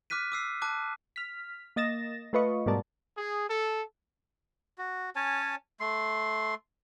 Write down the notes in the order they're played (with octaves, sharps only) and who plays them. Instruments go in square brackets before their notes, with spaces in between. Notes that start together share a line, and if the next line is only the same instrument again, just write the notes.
[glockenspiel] D6 F6 F#6 B6 D#7
D6 E6 C7
A5 D6 F#6
[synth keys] F6 B6
A#3 D#5 A6 A#6 E7
A3 F4 B4 D#5 C#6
G#2 B2 G3 A#4 D5 A5
[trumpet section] G#4
A4
[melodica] F#4
C#4 C#5 G#5 A5
A3 C6